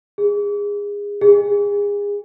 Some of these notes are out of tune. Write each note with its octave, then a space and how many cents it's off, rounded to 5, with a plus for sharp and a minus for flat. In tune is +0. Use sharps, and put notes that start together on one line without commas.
G#4 -25
G#4 -30